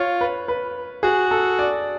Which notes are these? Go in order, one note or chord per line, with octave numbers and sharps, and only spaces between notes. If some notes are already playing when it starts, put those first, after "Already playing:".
Already playing: F4 C#5
B4
B4
F#4 G#4
A4
D5